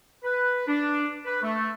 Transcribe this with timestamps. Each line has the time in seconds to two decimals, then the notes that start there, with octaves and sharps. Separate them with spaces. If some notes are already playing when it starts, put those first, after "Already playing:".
0.24 B4
0.67 D4
1.25 B4
1.43 A3